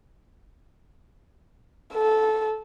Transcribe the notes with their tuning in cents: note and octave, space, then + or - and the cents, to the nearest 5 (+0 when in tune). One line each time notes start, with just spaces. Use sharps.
A4 -15